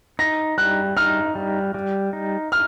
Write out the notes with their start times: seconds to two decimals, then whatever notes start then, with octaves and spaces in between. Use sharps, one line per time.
0.19 D#4 A#6
0.58 G3 F#6
0.97 D#4 F6
1.35 G3
1.74 G3
2.13 D#4
2.52 F6